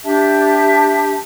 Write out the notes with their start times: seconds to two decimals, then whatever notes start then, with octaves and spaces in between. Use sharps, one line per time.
0.04 D4 G4 E5 A5